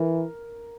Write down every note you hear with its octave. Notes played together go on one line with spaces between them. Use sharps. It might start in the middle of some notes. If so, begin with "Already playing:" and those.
Already playing: E3 A#4